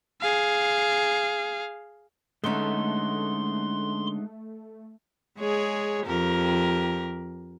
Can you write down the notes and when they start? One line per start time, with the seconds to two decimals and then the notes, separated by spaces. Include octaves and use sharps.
0.21 G#4 F5
2.44 D3 G#3 A3 B3 C#4 D#4 C6
5.38 G#3 G#4 C#5
6.06 F2 G4 A#4